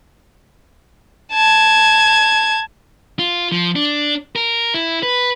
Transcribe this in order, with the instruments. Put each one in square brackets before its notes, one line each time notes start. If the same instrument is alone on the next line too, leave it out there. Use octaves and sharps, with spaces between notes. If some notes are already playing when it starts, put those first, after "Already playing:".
[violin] A5 G#6
[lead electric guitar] F4
F3
D4
A#4
E4
B4